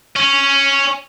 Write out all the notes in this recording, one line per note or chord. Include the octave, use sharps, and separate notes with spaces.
C#4